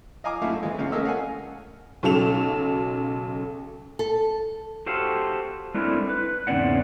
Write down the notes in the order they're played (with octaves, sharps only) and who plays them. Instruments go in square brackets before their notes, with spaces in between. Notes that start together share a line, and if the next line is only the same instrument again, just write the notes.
[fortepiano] D#5 F5 G#5 A#5 D6
F#2 F#3 A3 E4 F#4 F5
E3 G#3
C#2 C#3 G#3 F5
A3 C#4 A4 A#4 D#5 E6
F5 F#5 G#5
[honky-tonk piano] B1 C#3 F#3 A4 E7 F7
[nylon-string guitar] A4
[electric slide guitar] F#4 G4 A4 C5 F5
G#3 A3 C4 D4 E4 A#4
B4
E2 G#2 C#3 C4 D5 F#5